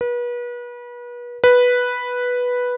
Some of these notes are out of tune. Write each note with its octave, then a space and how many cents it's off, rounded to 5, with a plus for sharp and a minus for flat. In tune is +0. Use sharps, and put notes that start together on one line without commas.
B4 -35
B4 -5